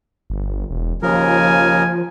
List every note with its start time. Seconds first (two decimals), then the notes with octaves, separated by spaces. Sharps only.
0.30 G1
0.70 E1
1.03 D#2 C#3 F3 A#4 G#5